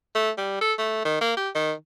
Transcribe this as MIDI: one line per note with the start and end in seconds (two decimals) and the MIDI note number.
0.16 0.30 57
0.38 0.57 55
0.61 0.73 69
0.79 1.01 57
1.05 1.21 51
1.21 1.35 58
1.37 1.49 67
1.55 1.72 51